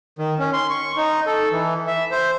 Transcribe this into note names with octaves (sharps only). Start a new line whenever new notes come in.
D#3
C#4
C6
C#6
D#4
A4
E3
E5
C5